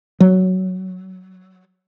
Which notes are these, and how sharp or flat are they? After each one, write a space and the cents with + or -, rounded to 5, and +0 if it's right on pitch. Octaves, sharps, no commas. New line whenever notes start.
F#3 +10